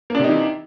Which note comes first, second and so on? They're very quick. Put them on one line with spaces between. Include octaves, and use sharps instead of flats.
A#3 D4 C3 D#4 E3